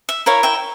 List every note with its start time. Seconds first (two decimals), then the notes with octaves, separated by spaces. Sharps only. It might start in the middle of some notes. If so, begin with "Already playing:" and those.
0.09 E5
0.26 E4 A#4 C#5 F5
0.43 E5 G5